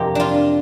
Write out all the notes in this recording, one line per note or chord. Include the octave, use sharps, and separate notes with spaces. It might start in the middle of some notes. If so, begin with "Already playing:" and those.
Already playing: F2 C3 A#3 G4
D4 F4